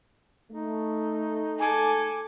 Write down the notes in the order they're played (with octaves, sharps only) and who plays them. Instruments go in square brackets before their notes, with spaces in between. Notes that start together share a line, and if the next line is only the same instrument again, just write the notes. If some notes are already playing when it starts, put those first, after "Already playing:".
[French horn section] A3 [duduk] D#4
[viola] A4 D6 [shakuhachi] G#5